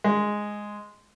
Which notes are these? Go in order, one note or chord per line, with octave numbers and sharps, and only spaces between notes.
G#3